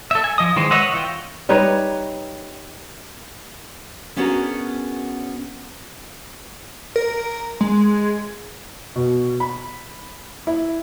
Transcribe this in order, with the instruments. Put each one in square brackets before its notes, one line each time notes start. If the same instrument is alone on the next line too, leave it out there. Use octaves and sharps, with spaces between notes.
[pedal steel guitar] A4 E5
G#5
F3 D#5 D#6
D#3 E3 G#3 C5
B4 C#5 D#5 E5 F#5
E3 F4 G5
[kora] G3 D#4 B4 C#5
[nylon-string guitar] B3 C#4 D4 F#4 G#4 A#4
[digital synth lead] A#4
G#3
[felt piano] B2
B5
E4